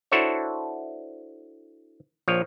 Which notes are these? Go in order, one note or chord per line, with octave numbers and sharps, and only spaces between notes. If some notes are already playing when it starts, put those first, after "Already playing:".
D4 E4 F#4 A4 C5 C#5
A#1 F3 C#5